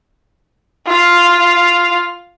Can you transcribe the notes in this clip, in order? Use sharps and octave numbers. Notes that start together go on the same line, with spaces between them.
F4 F5